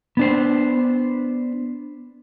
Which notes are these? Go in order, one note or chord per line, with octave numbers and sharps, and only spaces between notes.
B3 D4 C5